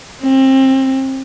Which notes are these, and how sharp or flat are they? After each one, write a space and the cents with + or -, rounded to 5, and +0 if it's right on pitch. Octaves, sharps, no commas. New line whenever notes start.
C4 +25